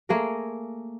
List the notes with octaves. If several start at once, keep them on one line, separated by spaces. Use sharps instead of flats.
A3 A#3 G#4 A#4